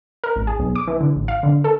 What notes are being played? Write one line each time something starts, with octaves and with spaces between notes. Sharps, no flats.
A#4
A1
G#4
B1
D6
E3
D3
A1
F5
D3
A4